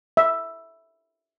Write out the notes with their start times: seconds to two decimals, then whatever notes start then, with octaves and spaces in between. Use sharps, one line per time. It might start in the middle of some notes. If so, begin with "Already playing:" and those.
0.17 E5